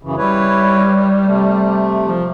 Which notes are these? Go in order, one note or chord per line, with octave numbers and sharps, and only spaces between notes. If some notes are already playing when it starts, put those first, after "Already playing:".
F#2 C#3 E3
G3 E4 B4 C#5
C3 A3
F3